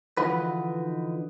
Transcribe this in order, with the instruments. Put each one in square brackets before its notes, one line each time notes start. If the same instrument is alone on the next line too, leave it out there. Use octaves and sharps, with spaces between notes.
[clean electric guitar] D3 E3 F3 D#4 F#4 B4